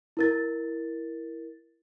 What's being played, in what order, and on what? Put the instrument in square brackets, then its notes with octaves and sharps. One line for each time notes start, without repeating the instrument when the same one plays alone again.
[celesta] E4 A#4 A6